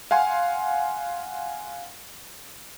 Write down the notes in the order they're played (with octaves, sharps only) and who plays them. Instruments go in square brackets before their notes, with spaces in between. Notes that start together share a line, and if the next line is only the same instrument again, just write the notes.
[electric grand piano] F5 F#5 G#5 C6